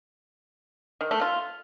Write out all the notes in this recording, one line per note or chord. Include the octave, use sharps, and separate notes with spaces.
D#3
A3
F4